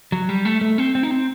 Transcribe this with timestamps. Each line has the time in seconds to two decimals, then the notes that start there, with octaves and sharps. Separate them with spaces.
0.12 F#3
0.29 G3
0.45 A3
0.61 A3
0.78 C4
0.95 C4
1.03 D#4
1.11 C4